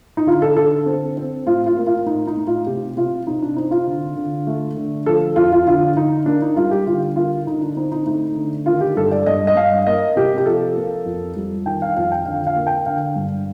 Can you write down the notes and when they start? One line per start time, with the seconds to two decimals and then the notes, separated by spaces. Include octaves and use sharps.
0.17 D#4
0.26 D3 F4
0.42 A4
0.57 D3 A4
0.86 C4
1.17 C4
1.46 A2 F4
1.66 F4
1.76 A#3
1.87 F4
2.06 A2 D#4
2.27 D#4
2.37 A2
2.47 F4
2.66 C3 G4
2.97 C3 F4
3.27 C3 D#4
3.42 D4
3.56 C4 D#4
3.71 F4
3.87 D3
4.16 D3
4.47 A3
4.77 D3
5.06 F3 A4
5.36 F2 F4
5.52 F4
5.67 D3 F4
5.96 D3 D#4
6.26 A#3 D4
6.42 D#4
6.56 G3 F4
6.71 G4
6.87 D3 F4
7.16 A#3 F4
7.47 D3 D#4
7.61 D4
7.77 C4 D#4
7.92 D#4
8.06 A3 D#4
8.36 D3
8.66 D#3 F4
8.81 G4
8.96 G2 A4
9.12 D5
9.26 G2 D#5
9.47 D#5
9.56 G2 F5
9.87 A#3 D#5
10.16 C3 G4
10.38 G4
10.46 F3 A4
10.76 A#3
11.06 F2
11.36 G3
11.66 D#3 G5
11.82 F5
11.96 F2 F5
12.11 G5
12.26 D3 F5
12.47 F5
12.56 A#3
12.67 G5
12.86 D3 F5
13.16 G2